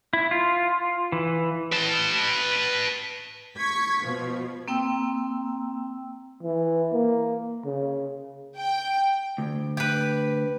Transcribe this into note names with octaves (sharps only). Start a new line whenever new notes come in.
E4
F4
E3
B4 A5
C#6 G#6 B6
B2 F3
A#3 C4 G5 A#5 E6
E3
A#3
C#3
G5
D2
G4 B4